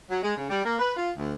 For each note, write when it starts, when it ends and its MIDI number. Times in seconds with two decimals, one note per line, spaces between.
0.10 0.18 54
0.23 0.34 56
0.36 0.48 49
0.50 0.61 55
0.64 0.79 58
0.79 0.92 71
0.95 1.10 65
1.16 1.33 38